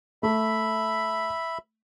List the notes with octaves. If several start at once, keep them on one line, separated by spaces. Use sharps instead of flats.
A3 E5 B5